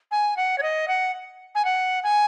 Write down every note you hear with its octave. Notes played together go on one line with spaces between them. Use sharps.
G#5
F#5
C#5
D#5
F#5
G#5
F#5
G#5